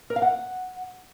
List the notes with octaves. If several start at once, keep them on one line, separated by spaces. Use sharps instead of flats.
A#4
F5
F#5